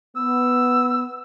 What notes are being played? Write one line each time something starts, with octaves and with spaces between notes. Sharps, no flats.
B3 E6